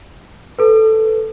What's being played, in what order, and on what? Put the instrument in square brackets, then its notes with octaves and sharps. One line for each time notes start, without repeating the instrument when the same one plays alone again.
[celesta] A4 B4